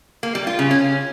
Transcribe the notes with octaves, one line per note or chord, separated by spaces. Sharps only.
A#3
G3
F4
C#3
C#4